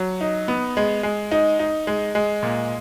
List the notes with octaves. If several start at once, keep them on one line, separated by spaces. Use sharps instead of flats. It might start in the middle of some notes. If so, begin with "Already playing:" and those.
Already playing: F#3
D#4
B3
G#3
G#3
D#4
D#4
G#3
G#3
A#2